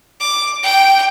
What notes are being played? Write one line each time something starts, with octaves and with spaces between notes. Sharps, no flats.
D6
G5